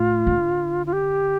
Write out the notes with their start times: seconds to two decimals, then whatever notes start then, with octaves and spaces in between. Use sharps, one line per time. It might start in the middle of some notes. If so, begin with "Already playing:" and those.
Already playing: A2 F4
0.27 D3
0.86 F4
0.93 G4